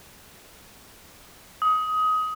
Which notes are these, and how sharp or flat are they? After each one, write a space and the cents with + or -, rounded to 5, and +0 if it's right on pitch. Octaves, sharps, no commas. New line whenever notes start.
D#6 +20